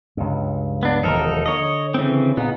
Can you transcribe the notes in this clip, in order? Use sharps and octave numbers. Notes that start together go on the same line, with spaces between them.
C#2 G2
B3 D4
E1 D#2 F3 D#4 A4 A#4
D3 C#5 D#5
C#3 E3 C4
A#2 C#3 B3 D#4